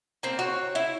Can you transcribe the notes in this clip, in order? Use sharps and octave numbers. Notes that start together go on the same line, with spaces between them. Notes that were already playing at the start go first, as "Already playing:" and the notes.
A#3 C4
F#4 C#5
E4